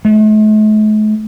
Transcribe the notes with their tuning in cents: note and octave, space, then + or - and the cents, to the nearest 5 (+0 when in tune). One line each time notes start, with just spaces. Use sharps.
A3 -45